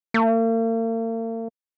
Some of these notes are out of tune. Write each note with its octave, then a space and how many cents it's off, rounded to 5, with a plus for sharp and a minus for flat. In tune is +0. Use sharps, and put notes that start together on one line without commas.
A#3 -45